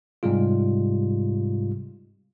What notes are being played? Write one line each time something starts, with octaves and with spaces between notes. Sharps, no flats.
G#2 C3 G3 G#3 F4